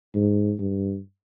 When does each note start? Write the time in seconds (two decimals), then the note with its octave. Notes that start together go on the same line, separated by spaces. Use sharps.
0.15 G#2
0.59 G2